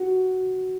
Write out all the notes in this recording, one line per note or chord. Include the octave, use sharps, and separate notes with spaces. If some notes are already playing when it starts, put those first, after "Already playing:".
Already playing: F#4